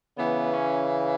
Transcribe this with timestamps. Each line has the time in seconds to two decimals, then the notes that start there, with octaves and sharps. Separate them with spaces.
0.17 C#3 E3 B3
0.53 C#4